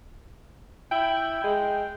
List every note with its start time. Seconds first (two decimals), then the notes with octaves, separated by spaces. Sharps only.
0.91 E4 G5
1.44 G#3